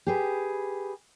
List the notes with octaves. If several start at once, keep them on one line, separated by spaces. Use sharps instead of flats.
G4 G#4 B4